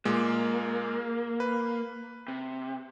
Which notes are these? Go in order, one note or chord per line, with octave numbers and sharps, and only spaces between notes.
A#2 G#3 A#3
B4
C3